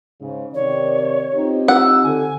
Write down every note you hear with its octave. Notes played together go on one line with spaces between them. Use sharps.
G#2 C#3
C3 D#3 C#5 D5
C4 D#4 F4 G4
F#5 E6
D3 G#5